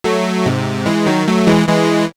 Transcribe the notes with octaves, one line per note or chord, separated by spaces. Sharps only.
F#3 A3
G#2 C3
E3 G#3
D#3 F#3
F#3 A3
E3 G#3
E3 G#3